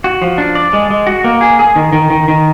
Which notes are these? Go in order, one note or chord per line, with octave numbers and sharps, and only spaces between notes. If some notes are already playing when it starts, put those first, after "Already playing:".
F#4
F3
D4
D5
G#3
G#3
F#4
A#3
G#4
G#4
D#3
D#3
D#3
D#3